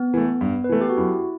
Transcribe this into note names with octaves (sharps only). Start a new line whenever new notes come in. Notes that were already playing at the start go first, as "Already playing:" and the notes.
Already playing: B3
E3 A3
G2
B4
E3 A3 A4
G4
F#4
F#2 E4